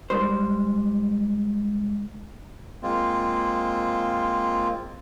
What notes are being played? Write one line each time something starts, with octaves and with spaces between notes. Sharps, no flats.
G#2 G3 C5
G#3 A#3 C4 F4